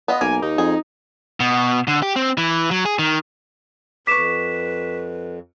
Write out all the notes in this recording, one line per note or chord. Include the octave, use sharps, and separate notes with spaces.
B3 F4 D#5
B1 A#3 G#5
D#2 D#4
F2 G#4
B2
D3
G4
C4
E3
F#3
G#4
D#3
F2 B4 C#6 D6 B6 E7